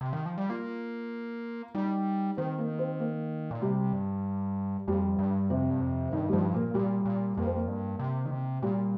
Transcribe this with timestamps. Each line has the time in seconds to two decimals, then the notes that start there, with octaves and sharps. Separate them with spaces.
0.01 C3
0.13 D#3
0.26 F3
0.38 G3
0.50 A#3 F4
1.75 G3 D#4
2.37 D#3 C4
2.58 A#3
2.79 C4
2.99 A#3
3.51 A#2
3.62 C3 G3
3.93 G2
4.88 F2 G3
5.19 G2
5.49 F2 C3
5.70 G2
5.81 F2
6.12 G2 D#3
6.29 G3
6.32 G2 F3
6.53 A#2 A#3
6.74 A#2 G3
7.05 A#2
7.37 F2 A#3
7.46 C4
7.56 A#3
7.68 G2
7.99 C3
8.25 D#3
8.31 C3
8.62 A#2 G3